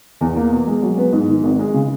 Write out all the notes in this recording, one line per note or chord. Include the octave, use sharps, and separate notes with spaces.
E2
A#3
B2
G#3
F#3
B3
G#2
D#3
G#1
G#3
C#3